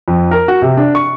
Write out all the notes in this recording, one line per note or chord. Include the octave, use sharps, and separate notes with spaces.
F2
A#4
F#4
C3
D4
C#6